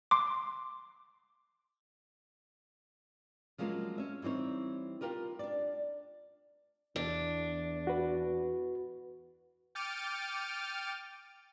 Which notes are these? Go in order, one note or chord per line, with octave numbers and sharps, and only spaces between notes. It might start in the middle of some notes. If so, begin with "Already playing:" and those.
C6 D6
F3 F#3 G#3 A#3 C#4 F4
C#4 E5
E3 G3 C4 D#4 C#5
F4 G4 A#4 B4
D4 D5
E2 D4
F#4 B4
G5 D6 F6 A6 C#7 D#7